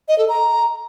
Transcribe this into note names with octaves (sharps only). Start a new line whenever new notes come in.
D#5
A4
A#5